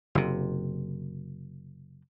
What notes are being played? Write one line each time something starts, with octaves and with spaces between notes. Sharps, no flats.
F#1 C3